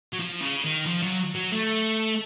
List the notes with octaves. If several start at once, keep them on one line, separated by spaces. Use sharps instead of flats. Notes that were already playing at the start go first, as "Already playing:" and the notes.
F#3
F3
C#3
D#3
F3
F#3
F#3
A3